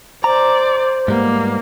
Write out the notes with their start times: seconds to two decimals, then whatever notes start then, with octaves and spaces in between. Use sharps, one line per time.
0.24 C5 D5 A#5
1.08 G#2 G3 A#3 B3